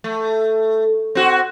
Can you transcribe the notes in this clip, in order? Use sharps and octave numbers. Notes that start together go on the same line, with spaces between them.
A3
C4 F#4